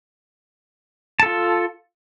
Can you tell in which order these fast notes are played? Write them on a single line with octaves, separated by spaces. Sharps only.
A5 A4 F4